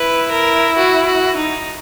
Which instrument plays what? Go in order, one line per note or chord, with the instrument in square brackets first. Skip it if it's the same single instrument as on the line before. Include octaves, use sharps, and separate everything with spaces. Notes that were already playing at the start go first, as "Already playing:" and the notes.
Already playing: [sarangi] E4 [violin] B4
[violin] A#4
F#4
F#4
D#4